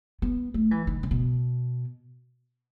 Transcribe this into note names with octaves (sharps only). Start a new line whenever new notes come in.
B3
A3
E3
D#3
C3
B2